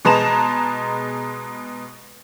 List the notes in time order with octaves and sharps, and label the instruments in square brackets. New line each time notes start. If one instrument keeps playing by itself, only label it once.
[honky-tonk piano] B2 G#3 B4 A5 A#5 E7